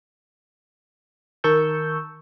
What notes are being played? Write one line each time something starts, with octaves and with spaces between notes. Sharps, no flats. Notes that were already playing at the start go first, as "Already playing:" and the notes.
D#3 A#4 A5 C#6 E6 G6